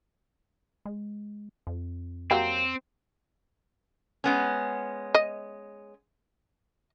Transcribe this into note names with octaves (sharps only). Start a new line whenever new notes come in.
G#3
F2
F#3 A#3 C4 G4
G#3 B3 C#4
D#5